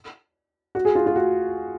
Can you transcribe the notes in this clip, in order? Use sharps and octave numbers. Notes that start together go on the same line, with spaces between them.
F#4
G#4
F4
F4
F#4